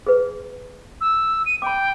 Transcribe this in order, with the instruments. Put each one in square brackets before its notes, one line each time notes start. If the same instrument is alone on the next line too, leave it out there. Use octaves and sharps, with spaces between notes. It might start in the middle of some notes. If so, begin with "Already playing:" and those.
[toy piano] G#4 B4
[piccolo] E6
D#7
[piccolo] G5 [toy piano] B5 D6